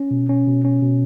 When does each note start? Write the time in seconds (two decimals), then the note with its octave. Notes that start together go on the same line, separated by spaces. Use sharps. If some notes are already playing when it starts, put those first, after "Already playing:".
Already playing: C#4
0.11 B2
0.29 C#4
0.47 B2
0.64 C#4
0.82 B2